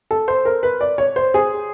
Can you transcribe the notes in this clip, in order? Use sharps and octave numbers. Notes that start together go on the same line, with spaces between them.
A4
C5
A#4
B4
D5
C#5
C5
G#4